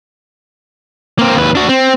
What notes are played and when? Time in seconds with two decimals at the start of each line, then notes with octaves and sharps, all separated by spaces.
1.19 A#3 C4
1.36 D#2 B4
1.55 D4 F#4
1.69 C4